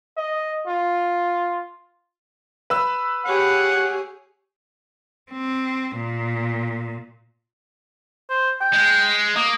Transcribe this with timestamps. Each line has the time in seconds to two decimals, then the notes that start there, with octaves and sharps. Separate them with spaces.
0.17 D#5
0.67 F4
2.70 B4 E6
3.26 G4 G#4 C#5 F#5
5.32 C4
5.96 A#2
8.30 C5
8.61 G5
8.73 G#3
9.36 A#3 D#6